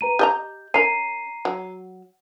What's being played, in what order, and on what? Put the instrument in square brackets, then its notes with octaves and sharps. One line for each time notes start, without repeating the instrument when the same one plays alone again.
[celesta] B4 A#5 D#7
[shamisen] G4 D#5 A#5 [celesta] G6
[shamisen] C#4 A#4 [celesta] A#5 C7 D#7
[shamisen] F#3